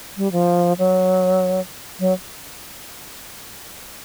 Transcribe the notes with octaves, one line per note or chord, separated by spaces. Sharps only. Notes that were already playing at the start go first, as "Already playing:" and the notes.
G3
F3
F#3
F#3